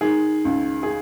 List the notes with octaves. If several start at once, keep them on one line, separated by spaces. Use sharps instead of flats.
D#3 G#4
C#2
G#4